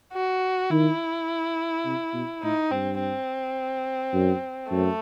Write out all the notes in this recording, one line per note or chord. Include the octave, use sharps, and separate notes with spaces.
F#4
D#3 E4
C3
B2
A2 D#4
G2 C4
C4
F#2
F#2 A3